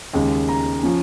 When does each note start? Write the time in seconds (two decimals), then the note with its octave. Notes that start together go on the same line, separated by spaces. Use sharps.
0.13 D#2 C#3 G#3
0.49 A#5
0.83 F3 C#4